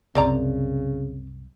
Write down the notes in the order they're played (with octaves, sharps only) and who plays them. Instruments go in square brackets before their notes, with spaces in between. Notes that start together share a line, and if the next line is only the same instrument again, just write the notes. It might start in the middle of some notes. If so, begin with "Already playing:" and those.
[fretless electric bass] C2 F#2 [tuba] C#3 [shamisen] C4 D5 A#5